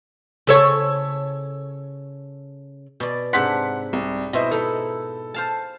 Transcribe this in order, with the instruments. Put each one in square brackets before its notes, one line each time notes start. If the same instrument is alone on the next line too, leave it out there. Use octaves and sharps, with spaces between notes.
[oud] C#3 A4 C#5
[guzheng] B2 D5
[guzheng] G#2 C3 D4 [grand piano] F#5 C6 B6
[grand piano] C2
[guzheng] B2 [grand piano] E4 C5 D#5
[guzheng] D#4 E4 [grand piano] A4
[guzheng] C5 F5 A5